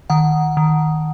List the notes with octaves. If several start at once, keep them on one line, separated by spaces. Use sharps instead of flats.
D#3 F#5
D#3